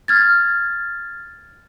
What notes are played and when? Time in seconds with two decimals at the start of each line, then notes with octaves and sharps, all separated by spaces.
0.08 F6 G#6 A6